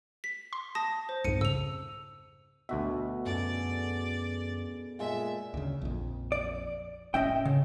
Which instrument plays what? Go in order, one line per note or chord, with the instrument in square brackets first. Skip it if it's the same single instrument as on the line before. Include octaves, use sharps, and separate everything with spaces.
[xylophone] B6
[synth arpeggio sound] C6
[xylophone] A5 D#6 A#6
C5
[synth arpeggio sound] C2 F2 G#2 [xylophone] C#7 D#7
[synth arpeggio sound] C#3 [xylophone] E6 F7
[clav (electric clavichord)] D2 F#4 E5 [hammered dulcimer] B2
[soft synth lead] F#2 [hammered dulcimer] G#4 A4 F#5 [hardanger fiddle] D5
[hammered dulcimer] A#2 G#3 A4 [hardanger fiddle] E5
[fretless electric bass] D2 C#3
A#1 F2
[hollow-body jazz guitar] D5
[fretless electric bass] F1 A2 C#4 [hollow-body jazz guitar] D#5 E5 G5
[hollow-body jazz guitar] C#3